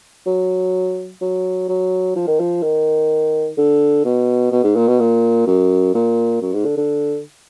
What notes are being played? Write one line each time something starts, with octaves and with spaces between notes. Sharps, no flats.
F#3
F#3
F#3
F3
D#3
F3
D#3
D3
B2
B2
G#2
A#2
B2
A#2
F#2
A#2
F#2
G#2
D3
D3